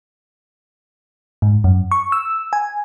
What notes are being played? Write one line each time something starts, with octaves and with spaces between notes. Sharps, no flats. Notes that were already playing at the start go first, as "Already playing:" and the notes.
G#2
F#2
C#6
E6
G#5